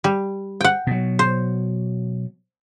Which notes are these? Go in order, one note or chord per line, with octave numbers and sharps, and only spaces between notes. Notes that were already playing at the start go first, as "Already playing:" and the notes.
G3
F#5 G5
B2 F#3
C5